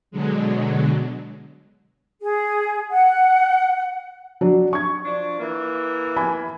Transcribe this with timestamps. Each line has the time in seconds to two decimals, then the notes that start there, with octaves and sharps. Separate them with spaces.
0.11 B2 D3 F#3 G#3
2.22 G#4
2.92 F#5
4.41 F#3 D4
4.73 C#6 G#6
5.05 F3 D4
5.39 E3 A#3
6.17 G#5 B5